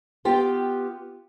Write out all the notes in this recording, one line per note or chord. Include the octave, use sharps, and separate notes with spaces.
B3 F4 G4 G5